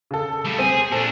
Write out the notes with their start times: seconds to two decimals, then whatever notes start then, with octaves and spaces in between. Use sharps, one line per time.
0.11 C#3 A4
0.45 G3 A3
0.59 C4 G#4
0.92 A#2 D4 A4